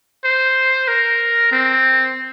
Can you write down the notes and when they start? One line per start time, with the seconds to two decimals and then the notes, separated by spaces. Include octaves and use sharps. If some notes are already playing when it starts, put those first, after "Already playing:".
0.25 C5
0.88 A#4
1.52 C4